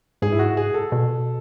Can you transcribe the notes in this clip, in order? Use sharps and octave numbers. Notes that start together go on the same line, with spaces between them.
G#2 G#4
E4
F#4
G#4
A4
B2